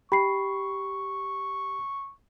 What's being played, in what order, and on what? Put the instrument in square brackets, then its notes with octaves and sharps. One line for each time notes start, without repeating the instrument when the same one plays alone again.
[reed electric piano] G4 [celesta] B5 C7 [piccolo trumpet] C#6